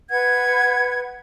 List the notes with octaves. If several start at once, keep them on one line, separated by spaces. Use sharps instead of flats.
B4 F#5 G#6